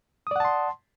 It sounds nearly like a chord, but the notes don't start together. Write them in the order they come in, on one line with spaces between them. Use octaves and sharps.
D#6 D5 F#5 A5 C6